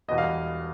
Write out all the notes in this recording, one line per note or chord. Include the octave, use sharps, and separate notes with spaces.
E1 E2 B2 G3 D#5
F5